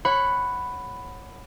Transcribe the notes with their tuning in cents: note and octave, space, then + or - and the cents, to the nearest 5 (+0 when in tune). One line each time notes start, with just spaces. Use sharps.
C#5 -20 F#5 +0 B5 +10